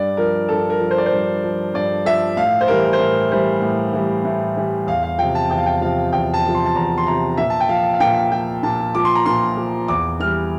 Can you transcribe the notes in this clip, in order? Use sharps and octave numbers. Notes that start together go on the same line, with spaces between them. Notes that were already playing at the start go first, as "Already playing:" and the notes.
Already playing: G2 D5
F3 A#4
G2 A4
A#4
F3
C5
D5
C5
G2
F3
G2 D5
F3 E5
A2 F5
C5
E3 G3 A#4
C5
A2 A#4
E3 G3 C5
A2
E3 G3
A2
E3 G3
E2 F5
F5
C3 F3 G5
A5
E2 G5
F5
G5
C3 F3 F5
E2 G5
A5
C3
F3
C6
A5
E2 A#5
C6
C3 F3 A#5
A#2 E5
A5
G5
F3 F5
F5
A#2 G5
F3 G5
A#2 A5
F3 D6
C6
A#5
A#2 C6
F3
E2 D6
E3 G3 F6